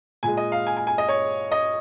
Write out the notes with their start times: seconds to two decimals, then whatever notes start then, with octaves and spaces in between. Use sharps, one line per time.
0.23 A#2 G#3 G#5
0.37 D#5
0.52 F5
0.67 G#5
0.77 G#5
0.87 G#5
0.98 D#5
1.08 C#5
1.52 D#5